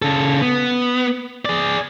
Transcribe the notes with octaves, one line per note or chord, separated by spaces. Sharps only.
C#3 A4
B3
G#4 D5